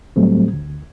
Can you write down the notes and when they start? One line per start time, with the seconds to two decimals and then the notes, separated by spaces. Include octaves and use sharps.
0.16 D2 A2 F#3 G3 A3 C4
0.54 D2